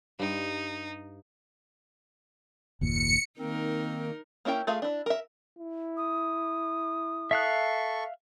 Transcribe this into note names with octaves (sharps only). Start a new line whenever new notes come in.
G2 D#4 G5
F#1 D#2 A#2 C#7
D#3 A#3 C4 D#4 A#4
A#3 C#4 E4 A#4 G5
A3 F4 G#4 E5 F5
D4 E4
A#4 E5
E4
D#6
A4 E5 F5 C#6 F#6